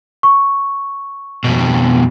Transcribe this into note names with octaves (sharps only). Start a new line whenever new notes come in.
C#6
F2 B2